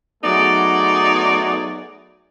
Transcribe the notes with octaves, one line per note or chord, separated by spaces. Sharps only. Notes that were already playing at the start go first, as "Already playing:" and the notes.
F#3 A3 B3 D#4 G#4 D5